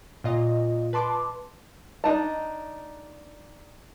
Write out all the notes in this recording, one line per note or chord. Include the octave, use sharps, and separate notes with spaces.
A#2 F4 D#5
B4 A5 C6 D6
D4 D#4 A5